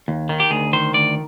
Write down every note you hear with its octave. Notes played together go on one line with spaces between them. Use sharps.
D#2
D#3
G4
D2 G#4
D#3 C5
D2 D5